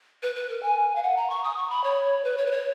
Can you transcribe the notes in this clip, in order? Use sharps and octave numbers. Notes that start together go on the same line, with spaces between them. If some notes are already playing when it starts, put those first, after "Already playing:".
B4
B4
A#4
G#5
F5
F#5
A#5
C#6
D#6
C#6
B5
C#5
B4
C#5
B4
C#5